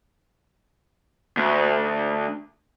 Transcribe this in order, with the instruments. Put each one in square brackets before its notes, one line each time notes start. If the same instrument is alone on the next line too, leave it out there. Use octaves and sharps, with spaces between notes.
[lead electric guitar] D2